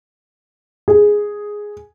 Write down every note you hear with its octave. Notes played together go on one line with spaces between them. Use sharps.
G#4